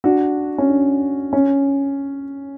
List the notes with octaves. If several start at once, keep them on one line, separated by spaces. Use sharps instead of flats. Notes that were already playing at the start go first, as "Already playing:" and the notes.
D4 F#4
C#4
D4
C#4